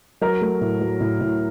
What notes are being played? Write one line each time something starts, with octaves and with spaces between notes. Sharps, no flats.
F#3 A#4
A3
A2
F#3
A2
A2